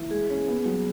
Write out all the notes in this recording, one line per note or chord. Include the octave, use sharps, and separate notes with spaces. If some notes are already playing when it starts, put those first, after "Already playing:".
Already playing: E3
G#3 G#4
C#4
B3
F#3